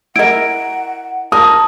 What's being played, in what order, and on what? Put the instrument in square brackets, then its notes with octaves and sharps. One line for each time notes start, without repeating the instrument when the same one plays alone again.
[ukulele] E4 A#4 [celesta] D#5 D7 [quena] F#5
[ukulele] A#4 [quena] A5 [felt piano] D#6